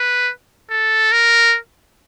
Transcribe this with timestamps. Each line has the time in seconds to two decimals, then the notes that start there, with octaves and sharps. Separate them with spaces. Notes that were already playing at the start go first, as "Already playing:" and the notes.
Already playing: B4
0.71 A4
1.12 A#4